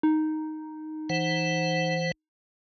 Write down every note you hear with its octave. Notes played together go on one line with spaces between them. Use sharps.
D#4
E3 C5 F#5